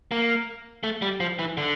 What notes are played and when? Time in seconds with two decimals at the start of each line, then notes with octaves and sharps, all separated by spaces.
0.11 A#3
0.84 A3
1.02 G3
1.20 F3
1.39 E3
1.57 D3